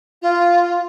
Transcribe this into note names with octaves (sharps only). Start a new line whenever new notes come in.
F4